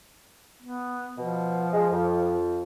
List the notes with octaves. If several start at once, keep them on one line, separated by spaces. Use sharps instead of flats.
B3
B2 F3
G#3
F2